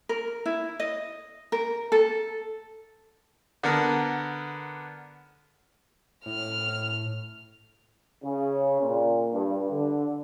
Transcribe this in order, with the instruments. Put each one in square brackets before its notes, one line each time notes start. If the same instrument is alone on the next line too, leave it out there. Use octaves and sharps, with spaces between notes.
[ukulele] A#4
E4
D#5
A#4
A4
[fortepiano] D3 B3 A#4
[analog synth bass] A2 [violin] F6
[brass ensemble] C#3
A#2
G2
D3